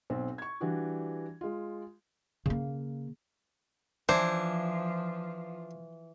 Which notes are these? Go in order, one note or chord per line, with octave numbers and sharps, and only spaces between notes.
B1 C4
C#6 G#6
E3 G3 D4 F#4 G4
G#3 F4
C#3 A#3
E3 F3 D4 F4 C5